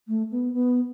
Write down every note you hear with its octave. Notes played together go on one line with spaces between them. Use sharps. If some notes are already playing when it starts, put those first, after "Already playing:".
A3
B3
B3